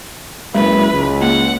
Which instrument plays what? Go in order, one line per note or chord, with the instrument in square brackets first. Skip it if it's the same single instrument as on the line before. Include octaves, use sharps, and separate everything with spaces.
[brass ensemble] F#1 E4 [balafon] G#3 [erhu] B4
[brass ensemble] C#2
[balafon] A#3 [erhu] F#5